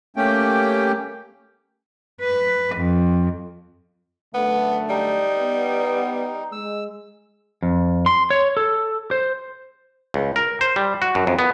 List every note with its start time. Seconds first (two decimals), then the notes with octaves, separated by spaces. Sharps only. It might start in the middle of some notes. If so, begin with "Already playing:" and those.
0.16 A3 A#3 C#4 G4 G5
2.21 B4
2.76 F2
4.34 F#2 D3 A3 B3
4.89 G3 D#4
5.38 B3
6.52 G#3 E6
7.62 F2
8.06 C6
8.30 C#5
8.57 A4
9.11 C5
10.14 C#2
10.36 A#4
10.61 C5
10.76 G3
11.02 F#4
11.15 F#2
11.27 F2
11.39 B3